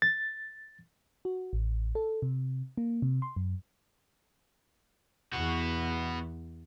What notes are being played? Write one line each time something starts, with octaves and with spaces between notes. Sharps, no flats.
A6
F#4
A1
A4
C3
A#3
C3
C6
F#2
E2 B3 F#4